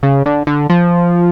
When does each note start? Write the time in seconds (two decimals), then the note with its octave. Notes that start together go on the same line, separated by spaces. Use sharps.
0.03 C#3
0.26 D3
0.47 D3
0.70 F3